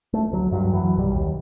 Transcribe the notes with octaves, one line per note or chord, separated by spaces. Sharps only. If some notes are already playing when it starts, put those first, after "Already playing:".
A3
D2 F#3
G2 F#3
F#2 E3 F#3
B1 G3
D#2